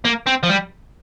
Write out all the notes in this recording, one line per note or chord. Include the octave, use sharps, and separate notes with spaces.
A#3
C4
F3
G3